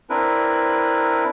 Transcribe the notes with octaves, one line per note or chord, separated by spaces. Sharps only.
C4 D4 E4 A#4 B4